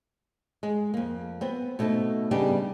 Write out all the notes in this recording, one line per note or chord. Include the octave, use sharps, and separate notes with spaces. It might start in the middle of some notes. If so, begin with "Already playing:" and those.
G#3
F2 A#3
B3 C4
B2 A3 C4 D#4
C#3 G3 B3 D4 D#4 G4